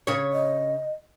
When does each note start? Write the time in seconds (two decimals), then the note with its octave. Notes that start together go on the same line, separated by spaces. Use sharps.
0.07 C#3 C#5
0.32 D#5